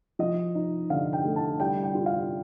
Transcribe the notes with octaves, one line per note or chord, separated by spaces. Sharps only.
F3 D#5
D#4
D3 F5
G5
A3
A5
G3 G5
G5
F4
F5